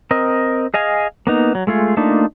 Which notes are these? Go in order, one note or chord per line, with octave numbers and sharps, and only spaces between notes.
C4 A#4 D#5
G#4 D#5 F5 G#5
A#3 B3 D#4
F#3
G#3 A3 F4 G#4
A3 A#3 D4 D#4 F4